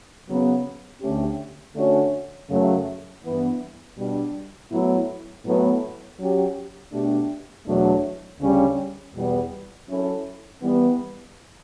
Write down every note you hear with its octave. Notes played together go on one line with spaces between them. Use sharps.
C#3 F#3 B3
D2 D3 A3 C#4 G4
D3 A3 C#4 F#4
F#2 C#3 F#3 A3
G2 E3 B3
B2 G3 D4
A2 F#3 B3 E4
A2 F#3 B3
F#3 C#4 G4
B2 A3 D4 G4
E2 B2 F#3 A3 D4
D2 C#3 G3 C#4
E2 B2 G3 B3
F#3 C#4 E4 A4
E3 G3 B3